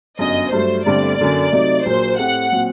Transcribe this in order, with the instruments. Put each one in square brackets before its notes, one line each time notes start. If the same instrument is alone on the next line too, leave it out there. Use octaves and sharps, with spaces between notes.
[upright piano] G1 F#2 F#3 [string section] D#5
[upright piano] G2 F#3 A3 [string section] C5
[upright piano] G1 G2 D3 A3 C4 [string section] D5
[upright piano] F#2 D3 F#3 A#3
C3 F#3 A3 D#4
[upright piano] A#1 A#2 F#3 A#3 [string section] C5
[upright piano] A2 A3 C4 G4 [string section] F#5
[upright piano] A#2 F#3 C4